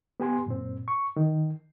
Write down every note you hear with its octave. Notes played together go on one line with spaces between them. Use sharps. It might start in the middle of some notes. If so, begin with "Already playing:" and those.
B3 G4 G#5 C6
F#2 A#2 C4
C#6
D#3